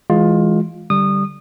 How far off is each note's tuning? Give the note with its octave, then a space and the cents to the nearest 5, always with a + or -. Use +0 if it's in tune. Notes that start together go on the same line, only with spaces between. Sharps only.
E3 +0 G#3 +0 F4 +15
D3 +0 G3 +0 D#6 -25